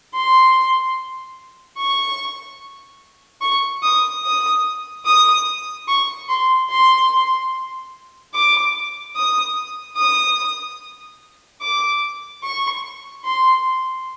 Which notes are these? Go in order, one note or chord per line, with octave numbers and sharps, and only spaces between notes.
C6
C#6
C#6
D#6
D#6
D#6
C#6
C6
C6
D6
D#6
D#6
D6
C#6
C6